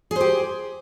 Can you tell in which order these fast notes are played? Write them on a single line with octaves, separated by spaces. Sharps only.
G#4 C5 G4